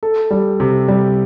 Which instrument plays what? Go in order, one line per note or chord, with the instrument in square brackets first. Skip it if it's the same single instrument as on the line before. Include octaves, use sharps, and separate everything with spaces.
[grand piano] A4
G3
C3
G3